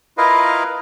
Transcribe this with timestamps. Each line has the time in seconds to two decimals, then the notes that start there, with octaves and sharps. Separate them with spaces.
0.18 E4 F4 A#4 B4 D#5 F5